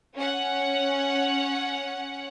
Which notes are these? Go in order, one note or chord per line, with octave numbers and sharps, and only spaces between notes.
C#4 F#5